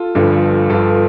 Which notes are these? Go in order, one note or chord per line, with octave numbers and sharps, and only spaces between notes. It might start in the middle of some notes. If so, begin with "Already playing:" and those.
Already playing: F4 A4
G1 G2 D3 F3
G1 G2 F3 F4 A4